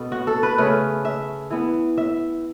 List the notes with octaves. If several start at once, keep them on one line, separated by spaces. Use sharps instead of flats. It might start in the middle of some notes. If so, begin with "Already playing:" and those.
Already playing: B2 B3 A4
F#4
A4
B4
C#3 A3 C#4 B4
E5
E3 B3
E5